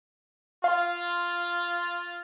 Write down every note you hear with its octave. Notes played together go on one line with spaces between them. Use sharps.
F4 F5